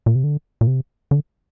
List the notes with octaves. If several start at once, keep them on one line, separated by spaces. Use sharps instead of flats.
A#2
C3
D3
A#2
C3
D3